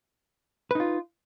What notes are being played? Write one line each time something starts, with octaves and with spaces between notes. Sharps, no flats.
D#4 F4 B4